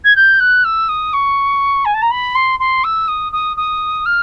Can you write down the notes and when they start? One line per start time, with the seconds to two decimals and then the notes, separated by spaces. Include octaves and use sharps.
0.04 G#6
0.16 G6
0.40 F#6
0.65 E6
0.89 D#6
1.13 C#6
1.85 G#5
1.94 A5
2.02 A#5
2.11 B5
2.35 C6
2.60 C6
2.84 E6
3.08 D#6
3.32 D#6
3.57 D#6
4.06 F6